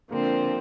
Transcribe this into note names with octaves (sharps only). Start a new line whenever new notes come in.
D3 F3 A#3 C4